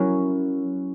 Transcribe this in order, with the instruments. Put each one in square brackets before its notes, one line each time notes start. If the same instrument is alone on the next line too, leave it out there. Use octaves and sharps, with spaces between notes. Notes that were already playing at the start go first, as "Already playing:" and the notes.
Already playing: [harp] F#3 C#4 E4 A#4